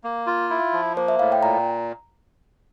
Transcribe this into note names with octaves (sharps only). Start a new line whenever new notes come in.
A#3
F4
E4
F3
A#3 C5
E5
A2 F5
G5
A#2 A#5